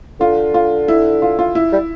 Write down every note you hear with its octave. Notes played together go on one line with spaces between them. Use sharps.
D3 F4
F4
E4
F4
F4
E4
G3